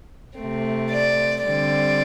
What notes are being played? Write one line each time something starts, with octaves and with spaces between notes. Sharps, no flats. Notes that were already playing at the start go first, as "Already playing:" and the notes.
C3 A3 C4
D5
D3 G3 C4 D5